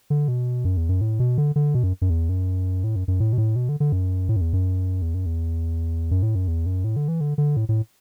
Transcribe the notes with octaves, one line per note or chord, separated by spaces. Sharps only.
D3
B2
F#2
E2
F#2
A2
B2
D3
D3
B2
F#2
F#2
E2
F#2
A2
F#2
F#2
A2
B2
A2
B2
D3
D3
F#2
A2
F#2
E2
F#2
E2
F#2
E2
F#2
A2
F#2
E2
F#2
A2
D3
E3
D3
D3
A2
A2